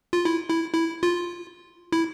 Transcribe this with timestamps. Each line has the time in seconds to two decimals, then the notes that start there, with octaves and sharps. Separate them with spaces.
0.13 F4
0.25 E4
0.50 E4
0.73 E4
1.03 F4
1.92 E4